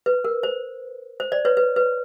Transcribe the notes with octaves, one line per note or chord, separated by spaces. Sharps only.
B4
A#4
C5
C5
C5 D5
B4 C#5
B4
B4